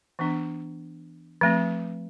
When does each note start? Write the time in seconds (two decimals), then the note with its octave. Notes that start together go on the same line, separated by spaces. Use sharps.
0.19 E3 B3 D4
1.41 F3 A3 C4